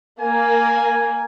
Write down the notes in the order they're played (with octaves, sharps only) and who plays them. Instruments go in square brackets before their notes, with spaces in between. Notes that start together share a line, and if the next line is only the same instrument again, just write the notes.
[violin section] A#3 [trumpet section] G#5